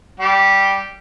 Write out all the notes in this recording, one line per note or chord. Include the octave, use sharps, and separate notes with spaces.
G3 G4